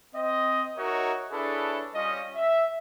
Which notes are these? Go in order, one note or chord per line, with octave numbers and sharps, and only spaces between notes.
C4 D#5
D#4 F#4 A#4 C#5 D#5 E5
D4 E4 G#4 A4 B4 C#5
G3 C#4 F4 D#5
E5